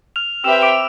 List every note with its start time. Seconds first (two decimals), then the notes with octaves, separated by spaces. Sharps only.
0.16 F6 F7
0.44 C4 G4 B4 E5 G5 E6 E7
0.62 D6 D7